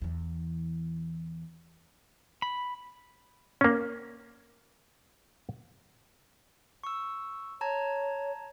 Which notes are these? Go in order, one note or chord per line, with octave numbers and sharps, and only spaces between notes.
E2 E3
B5
A#3 C#4
C#6 E6
C#5 A5 A#5 G#6